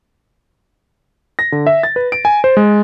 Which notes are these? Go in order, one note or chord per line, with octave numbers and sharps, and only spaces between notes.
A#6
D3
E5
A6
B4
D7
G#5
C5
G#3